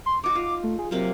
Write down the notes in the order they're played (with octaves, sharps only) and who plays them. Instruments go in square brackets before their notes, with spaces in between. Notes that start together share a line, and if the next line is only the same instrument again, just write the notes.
[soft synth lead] C6
[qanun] D#4 F#4 [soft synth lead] D6
[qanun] F4
[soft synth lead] A3
G#4
[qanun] C3 A#3 C4 [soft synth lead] F#3